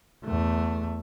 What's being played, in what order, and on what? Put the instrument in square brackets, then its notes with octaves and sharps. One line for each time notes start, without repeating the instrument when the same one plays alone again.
[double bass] E2 A3